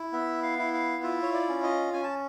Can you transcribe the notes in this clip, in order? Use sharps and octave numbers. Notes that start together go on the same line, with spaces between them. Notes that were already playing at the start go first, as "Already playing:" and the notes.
Already playing: E4
B3 E5
F5
E4
F5
F4 E5
C#5
D5
C#4
D#5
C#4 G#5
A5